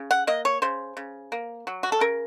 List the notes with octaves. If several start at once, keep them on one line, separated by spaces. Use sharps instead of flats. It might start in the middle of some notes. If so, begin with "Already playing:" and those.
Already playing: C#3
F#5
A#3 D#5
C#5
C#3 C5
C#3
A#3
F#3
F#4
A4
C#3 A#4